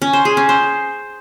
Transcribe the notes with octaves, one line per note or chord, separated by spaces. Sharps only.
C#4
C5
G#4
C#4
C5